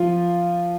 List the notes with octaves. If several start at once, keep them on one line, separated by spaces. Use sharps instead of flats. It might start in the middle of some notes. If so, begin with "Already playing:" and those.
Already playing: F3 F4